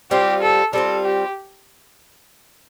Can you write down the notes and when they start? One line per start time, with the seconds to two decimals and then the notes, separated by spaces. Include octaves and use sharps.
0.11 G3 C4 F4 G4
0.42 A4
0.73 G3 C4 F4 A4
1.05 G4